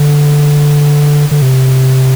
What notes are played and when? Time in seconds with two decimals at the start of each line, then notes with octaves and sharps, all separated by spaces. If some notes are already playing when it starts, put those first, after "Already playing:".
Already playing: D3
1.31 D3
1.42 C3